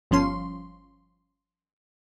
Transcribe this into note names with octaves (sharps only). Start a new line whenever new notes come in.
G1 F3 C#4 C6